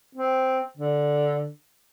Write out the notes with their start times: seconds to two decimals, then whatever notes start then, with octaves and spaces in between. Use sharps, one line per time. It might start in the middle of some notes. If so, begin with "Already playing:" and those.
0.15 C4
0.77 D3